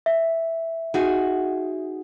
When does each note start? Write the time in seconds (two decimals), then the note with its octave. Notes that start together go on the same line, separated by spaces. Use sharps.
0.06 E5
0.94 D#4 F#4 G#4